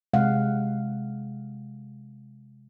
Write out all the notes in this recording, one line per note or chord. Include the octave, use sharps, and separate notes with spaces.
C3 G#3 F5 F#5